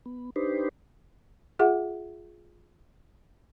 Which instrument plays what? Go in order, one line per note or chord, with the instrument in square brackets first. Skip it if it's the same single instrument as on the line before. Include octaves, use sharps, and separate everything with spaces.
[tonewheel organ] B3
D4 D#4 G4 B4 C5
[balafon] F4 G#4 E5 F#5